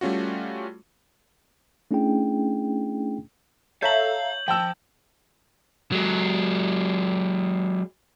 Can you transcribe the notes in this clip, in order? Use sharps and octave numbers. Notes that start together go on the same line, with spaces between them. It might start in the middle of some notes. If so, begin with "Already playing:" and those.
G3 A3 C#4 F4 F#4
A3 C#4 D4 E4 G#4 G5
A4 C#5 E5 F5 A#5 G6 F#7
F3 G5 A5 E6 A#6 D7
F#3 G#3